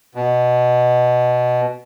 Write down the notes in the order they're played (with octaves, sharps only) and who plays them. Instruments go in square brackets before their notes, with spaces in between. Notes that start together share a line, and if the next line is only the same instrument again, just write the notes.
[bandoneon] B2